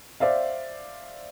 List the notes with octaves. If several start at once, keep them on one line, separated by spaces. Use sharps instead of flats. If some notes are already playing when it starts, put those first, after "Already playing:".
C5 D5 E5 F5